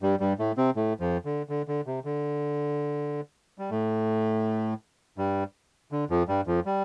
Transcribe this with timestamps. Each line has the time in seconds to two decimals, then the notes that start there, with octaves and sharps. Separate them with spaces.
0.02 G2 G3
0.20 G2 G3
0.39 A2 A3
0.57 C3 C4
0.76 A2 A3
1.00 F2 F3
1.25 D3
1.49 D3
1.68 D3
1.87 C3
2.05 D3
3.58 G3
3.70 A2 A3
5.18 G2 G3
5.92 D3
6.10 F2 F3
6.28 G2 G3
6.47 F2 F3
6.66 G3